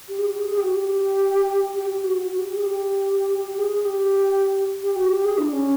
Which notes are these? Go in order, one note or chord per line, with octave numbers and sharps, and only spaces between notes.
G4
G#4
G4
G#4
G#4
G4
F#4
G4
G4
G4
F#4
F#4
F#4
G4
G4
G#4
G4
G4
G#4
G#4
G4
G4
F#4
G4
G#4
D4
C#4